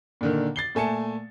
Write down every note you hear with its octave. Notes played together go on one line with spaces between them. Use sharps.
A#2 D3 D#3
A6 C7 G7
A#2 A3 G#5 A5 C#7